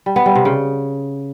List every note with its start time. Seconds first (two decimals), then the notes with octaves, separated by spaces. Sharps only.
0.06 G3
0.16 B3
0.26 G3
0.35 C3
0.45 C#3